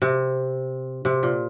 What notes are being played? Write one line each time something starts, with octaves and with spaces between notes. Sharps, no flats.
C3
C3
A#2